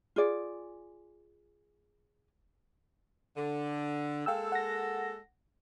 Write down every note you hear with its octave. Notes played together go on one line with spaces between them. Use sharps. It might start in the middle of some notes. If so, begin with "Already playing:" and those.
F4 G#4 D5
D3
G#3 A#3 A4 F5 G5 E6
F#5 A#6